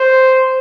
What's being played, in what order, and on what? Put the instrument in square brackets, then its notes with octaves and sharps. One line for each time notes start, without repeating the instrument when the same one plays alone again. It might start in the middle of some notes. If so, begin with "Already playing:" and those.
Already playing: [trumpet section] C5